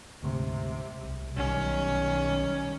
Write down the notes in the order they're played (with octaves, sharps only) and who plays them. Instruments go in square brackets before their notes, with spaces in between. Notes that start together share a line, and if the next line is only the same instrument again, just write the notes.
[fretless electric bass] D2 G#2 [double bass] C3
[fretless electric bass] C2
[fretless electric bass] B1 [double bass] D#3 G3 [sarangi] C#4